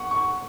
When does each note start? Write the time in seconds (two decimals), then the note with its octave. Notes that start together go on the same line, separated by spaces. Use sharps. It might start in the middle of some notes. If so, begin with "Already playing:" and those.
Already playing: F#5 C#6
0.11 C#6